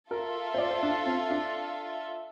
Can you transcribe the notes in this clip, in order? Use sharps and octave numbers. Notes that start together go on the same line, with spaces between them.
F4 A4 A#4 E5
C5
D5
C5
D4
C4
D4